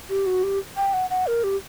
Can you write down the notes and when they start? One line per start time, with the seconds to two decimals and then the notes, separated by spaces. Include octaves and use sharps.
0.10 G4
0.26 F#4
0.43 G4
0.77 G5
0.94 F#5
1.10 F#5
1.27 A#4
1.44 G4